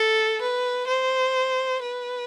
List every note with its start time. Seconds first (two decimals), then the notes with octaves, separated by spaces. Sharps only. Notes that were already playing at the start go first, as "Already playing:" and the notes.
Already playing: A4
0.41 B4
0.87 C5
1.82 B4